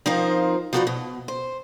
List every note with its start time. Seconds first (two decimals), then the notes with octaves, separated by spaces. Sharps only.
0.06 F3 C4 D#4 F4 A#4 C5
0.73 F3 D#4 F#4 A4 B4 D5
0.87 B2
1.28 C5